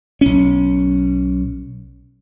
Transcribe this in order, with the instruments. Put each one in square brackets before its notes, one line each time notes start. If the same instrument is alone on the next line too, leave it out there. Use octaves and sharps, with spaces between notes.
[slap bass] B1 C#4